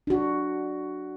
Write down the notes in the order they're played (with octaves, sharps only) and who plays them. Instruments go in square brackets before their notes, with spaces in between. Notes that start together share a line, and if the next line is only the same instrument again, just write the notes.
[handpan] D4 F#4